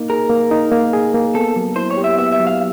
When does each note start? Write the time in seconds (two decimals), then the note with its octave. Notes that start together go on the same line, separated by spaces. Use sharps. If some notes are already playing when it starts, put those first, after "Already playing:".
Already playing: A#3 D#4
0.10 G#4 A#4
0.30 A#3
0.51 D#4
0.71 A#3
0.93 G#4
1.14 A#3
1.34 B3 A4
1.56 F#3
1.76 E4 C5
1.91 C#5
1.97 G4
2.04 E5
2.18 B3 E5
2.32 E5
2.39 F#3
2.47 F5